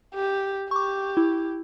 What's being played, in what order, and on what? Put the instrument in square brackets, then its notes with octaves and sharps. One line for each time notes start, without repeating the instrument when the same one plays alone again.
[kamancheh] G4
[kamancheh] G4 [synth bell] C#6 D6
[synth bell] E4